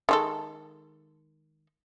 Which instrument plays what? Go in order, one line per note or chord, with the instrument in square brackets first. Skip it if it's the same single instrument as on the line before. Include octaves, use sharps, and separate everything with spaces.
[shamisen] D#3 G#3 A4